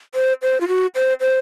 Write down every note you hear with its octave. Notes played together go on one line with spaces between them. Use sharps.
C5
C5
F4
F#4
C5
C5